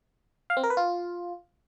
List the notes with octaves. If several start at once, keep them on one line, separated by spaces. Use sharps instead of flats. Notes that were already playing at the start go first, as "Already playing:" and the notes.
F5
C4
A#4
B4
F4